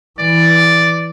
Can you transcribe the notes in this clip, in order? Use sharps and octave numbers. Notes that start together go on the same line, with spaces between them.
E3 D5